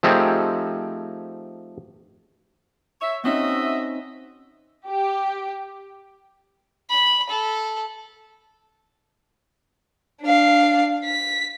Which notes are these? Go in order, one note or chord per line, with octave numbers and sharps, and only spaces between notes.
F3 A3 C4 D#4 G4 G#4
C#5 E5
C4 C#4 D#4 F#4 D#5 E5
G4
B5
A4
D4 F5
B6